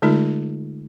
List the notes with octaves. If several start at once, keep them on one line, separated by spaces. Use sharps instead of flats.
D3 G#3 A3 D#4 F4 A#4